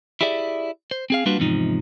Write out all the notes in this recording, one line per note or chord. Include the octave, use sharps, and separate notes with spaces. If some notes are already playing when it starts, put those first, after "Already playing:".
E4 G4 G#4 D5 E5
C5
C4 G#4 F5
G3 A#3 D4 F4 F#4 B4
E2 G#2 C3 F3 D#4